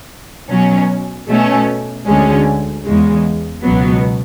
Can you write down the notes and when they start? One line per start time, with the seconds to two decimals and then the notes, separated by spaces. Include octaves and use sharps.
0.50 B2 F#3 C#4
1.28 B2 A3 C#4
2.07 D2 D3 G#3 C#4
2.85 E2 C#3 G#3
3.64 C#2 B2 F#3 B3